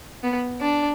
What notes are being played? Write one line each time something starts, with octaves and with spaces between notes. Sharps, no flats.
B3
D4